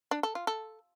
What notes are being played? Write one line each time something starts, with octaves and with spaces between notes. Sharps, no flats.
D4
A4
F4
A4